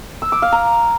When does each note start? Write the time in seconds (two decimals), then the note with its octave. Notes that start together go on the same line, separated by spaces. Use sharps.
0.22 E6
0.32 D6
0.42 F5
0.52 A#5